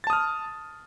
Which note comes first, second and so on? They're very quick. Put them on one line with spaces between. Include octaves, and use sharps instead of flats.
A6 A5 D#6 F6